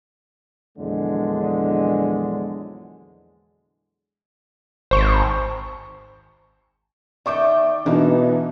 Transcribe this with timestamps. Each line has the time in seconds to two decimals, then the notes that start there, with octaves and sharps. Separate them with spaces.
0.78 A#1 E2 D3 F#3 G#3
4.91 G#1 C5 C#6
7.26 D#3 D5 E5 G5 C#6 D6
7.86 B2 E3 A#3 D4 D#4 A5